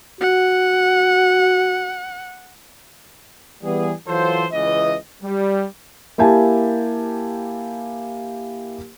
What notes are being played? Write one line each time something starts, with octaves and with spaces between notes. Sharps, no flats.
F#4 F#5
E3 G3 B3 G#4
E3 F#3 F4 A4 C5
C#2 E3 D#5
G3
A#3 E4 G4 G#5 A5